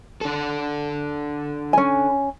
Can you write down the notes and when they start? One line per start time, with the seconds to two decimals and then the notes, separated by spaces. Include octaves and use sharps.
0.21 D4 A4
1.73 C#4 G#5